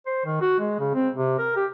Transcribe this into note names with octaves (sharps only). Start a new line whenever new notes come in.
C5
D#3
F#4
G#3
C#3
C4
C3
A#4
G4